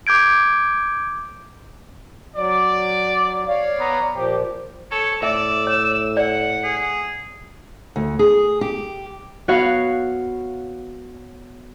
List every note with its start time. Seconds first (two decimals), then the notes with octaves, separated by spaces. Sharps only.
0.07 D6 G6 G#6 D7
2.35 F#3 D5
3.48 C#5 D5 F5
3.79 B3 A#5
4.14 A#2 F3 G4
4.91 A4 C#5
5.23 A2 D5 E5 E6
5.67 C#5
6.17 D5 F#5
6.64 G#4
7.96 D2
8.19 G#4
8.61 G4
9.48 B3 F#4 C#5 F5